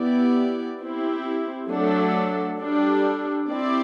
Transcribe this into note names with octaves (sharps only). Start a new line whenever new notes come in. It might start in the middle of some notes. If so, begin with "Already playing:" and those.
Already playing: B3 E4 G4 D5
C4 E4 G4
F#3 A3 D4 A4
G3 D4 A4
C4 E4 G4 D5